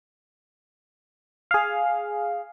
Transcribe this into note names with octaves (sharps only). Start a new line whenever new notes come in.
G#4 F5